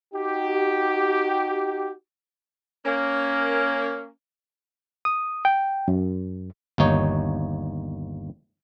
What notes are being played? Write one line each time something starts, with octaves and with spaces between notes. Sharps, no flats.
D#4 F#4 G4
A#3 C#4
D#6
G5
F#2
G1 D#2 D#4 C#5